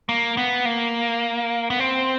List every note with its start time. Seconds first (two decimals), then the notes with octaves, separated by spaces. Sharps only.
0.09 A#3
0.37 B3
0.65 A#3
1.70 B3
1.79 C4